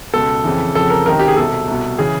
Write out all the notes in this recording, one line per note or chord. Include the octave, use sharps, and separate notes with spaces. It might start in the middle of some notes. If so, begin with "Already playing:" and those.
C#2 B2 A4
F2 C#3 E3
F2 C#3 F3 A4
A#4
C#2 C3 D#3 A#4
G4
G#4
C2 B2 A4
C2 B2
C#3 E3 G#4